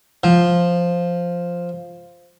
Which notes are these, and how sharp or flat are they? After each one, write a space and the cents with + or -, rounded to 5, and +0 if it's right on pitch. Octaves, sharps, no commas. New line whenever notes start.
F3 +0